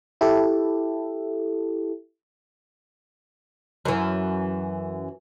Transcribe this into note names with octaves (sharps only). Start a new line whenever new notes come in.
E4 G4 A4
F#2 E3